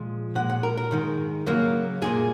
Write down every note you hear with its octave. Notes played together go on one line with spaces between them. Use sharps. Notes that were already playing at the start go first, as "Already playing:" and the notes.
Already playing: A#2 F3 G#3
A#2 G#3 F#5
F#5
A#4
A#4
G#2 D#3 G#3
F#2 C#3 F#3 A#3
C2 A#2 G#3 G#4